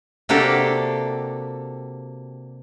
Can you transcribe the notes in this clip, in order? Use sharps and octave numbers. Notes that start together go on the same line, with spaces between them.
C3 A#3 D4 F#4 G4 A4